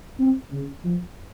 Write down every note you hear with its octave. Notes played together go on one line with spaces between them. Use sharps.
C4
C#3
F3